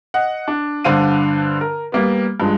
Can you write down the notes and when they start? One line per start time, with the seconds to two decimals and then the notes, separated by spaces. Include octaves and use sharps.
0.14 D#5 F#5
0.48 D4
0.84 G2 D3 D4 C5 F5 D#7
1.61 A#4
1.92 G3 A#3 B3
2.40 G2 F3 G#3